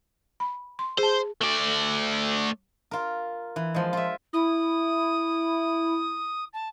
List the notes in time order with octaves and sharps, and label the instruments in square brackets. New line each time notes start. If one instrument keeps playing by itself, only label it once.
[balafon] B5
C6
[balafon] G#4 A5 [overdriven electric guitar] C5
[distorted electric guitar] A3 D5
[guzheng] F4 A#4
E3
F3 G#3
F4 E5
[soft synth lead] E4 [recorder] D#6
[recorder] A5